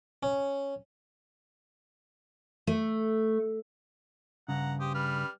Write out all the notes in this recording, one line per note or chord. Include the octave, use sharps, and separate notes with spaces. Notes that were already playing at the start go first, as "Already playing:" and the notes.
C#4
A3
G2 C#3 F#5 A#5
G4 C5 D#6
G3 B4 F6